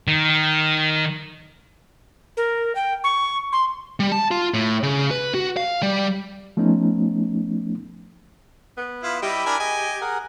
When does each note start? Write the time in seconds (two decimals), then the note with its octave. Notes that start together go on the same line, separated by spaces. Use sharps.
0.07 D#3
2.37 A#4
2.75 G5
3.04 C#6
3.52 C6
4.00 G3
4.12 A5
4.31 F4
4.54 A2
4.83 C#3
5.11 B4
5.34 F#4
5.57 F5
5.83 G3
6.57 F3 A3 B3 C#4 D#4
8.77 B3
9.03 E4 F4 F5 D#6
9.22 G3 E4 G4 D#5 E5 B5
9.46 D4 A#4 G#5
9.60 G#4 D#5 G#5
10.01 G#4 A#4 F#5